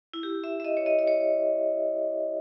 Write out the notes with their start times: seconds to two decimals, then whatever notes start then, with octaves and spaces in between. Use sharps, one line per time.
0.14 E4
0.23 G4
0.44 E5
0.60 E5
0.65 D#5
0.77 C#5
0.86 D#5
0.99 D#5
1.07 C#5